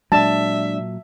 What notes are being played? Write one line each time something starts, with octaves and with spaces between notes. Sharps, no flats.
A#2 F#3 G#3 D4 D5 E5 A5